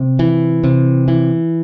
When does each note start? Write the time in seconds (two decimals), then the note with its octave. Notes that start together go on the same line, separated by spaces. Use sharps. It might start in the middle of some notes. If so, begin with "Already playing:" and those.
Already playing: C3
0.19 E3
0.64 C3
1.08 E3